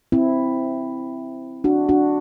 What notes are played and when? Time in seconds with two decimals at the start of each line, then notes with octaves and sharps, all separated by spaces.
0.12 C4 E4
1.64 D4 F#4
1.89 D4 F#4